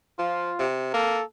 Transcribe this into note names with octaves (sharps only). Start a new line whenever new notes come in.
F3 F4
C3
A#3 A4